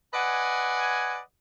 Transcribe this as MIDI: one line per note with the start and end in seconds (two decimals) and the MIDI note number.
0.14 1.19 71
0.14 1.19 74
0.14 1.19 75
0.14 1.19 78
0.14 1.19 80